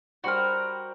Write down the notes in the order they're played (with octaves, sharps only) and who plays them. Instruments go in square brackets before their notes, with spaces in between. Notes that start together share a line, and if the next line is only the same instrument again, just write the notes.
[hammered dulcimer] G3 C5 G5 [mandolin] F#4 A#4